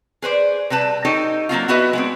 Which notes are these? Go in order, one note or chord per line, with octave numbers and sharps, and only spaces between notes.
G#4 B4 C5 D5
C3 G3 B4 A5
D#4 G4 A4 C#5 D#5
F#3 A#3 C4 F4
B3 E4 F#4 B4 D#5 E5
G#3 B3 C4